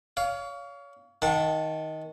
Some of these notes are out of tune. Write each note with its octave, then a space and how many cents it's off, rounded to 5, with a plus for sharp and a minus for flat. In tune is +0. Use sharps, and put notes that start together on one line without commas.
C#5 +35 F5 +0
D#3 +15 F#5 -35 A5 +0